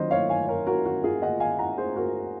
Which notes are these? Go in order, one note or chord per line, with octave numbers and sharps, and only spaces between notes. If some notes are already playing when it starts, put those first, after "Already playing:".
Already playing: D#3 F#3 A#3 C#4 A#4 C5 C#5 D#5
C#5 F5
F5 G#5
A#4 C#5
F#4 A#4
F#4
F4 G#4
D#5 F#5
F5 G#5
F#5 A#5
G#4 C5
F#4 A#4